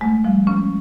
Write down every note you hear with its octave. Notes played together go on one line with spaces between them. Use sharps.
G#3 A3
F3 G3
G#3 C#4